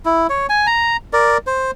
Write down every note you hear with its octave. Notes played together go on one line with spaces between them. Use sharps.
E4
C#5
G#5
A#5
A#4 D5
C5